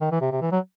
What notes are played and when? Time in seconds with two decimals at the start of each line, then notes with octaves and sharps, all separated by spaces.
0.01 D#3
0.11 E3
0.21 C3
0.32 C3
0.42 E3
0.52 F#3